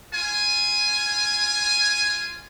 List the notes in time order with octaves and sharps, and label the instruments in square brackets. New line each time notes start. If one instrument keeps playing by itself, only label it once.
[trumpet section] F4 G#5